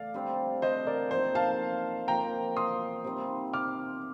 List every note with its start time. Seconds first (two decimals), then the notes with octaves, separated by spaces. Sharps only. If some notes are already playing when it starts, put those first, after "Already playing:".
Already playing: A3 D5 F5
0.14 D3 G3 C4 G4
0.62 C5 D#5
0.87 A#4 D5
1.11 F3 A#3 D#4 A4 C5
1.35 F5 A5
2.08 F3 A#3 F4 A#4 G5 A#5
2.57 C6 D#6
3.04 C3 G3 C4 D#4
3.53 D6 F6